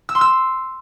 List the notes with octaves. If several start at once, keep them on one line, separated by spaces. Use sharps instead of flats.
E6
C6
E6